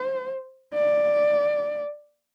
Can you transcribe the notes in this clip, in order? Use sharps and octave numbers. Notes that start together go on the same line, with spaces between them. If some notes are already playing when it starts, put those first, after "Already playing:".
Already playing: C5
D5